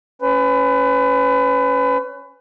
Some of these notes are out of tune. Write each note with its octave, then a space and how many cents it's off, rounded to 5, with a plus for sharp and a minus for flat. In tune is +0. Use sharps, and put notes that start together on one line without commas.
C#4 +0 B4 +25